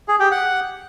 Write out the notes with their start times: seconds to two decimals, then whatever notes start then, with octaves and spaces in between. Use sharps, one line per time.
0.08 G#4
0.20 G4
0.31 F#5